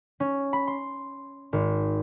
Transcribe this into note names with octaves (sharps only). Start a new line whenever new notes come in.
C#4
B5
C6
G#1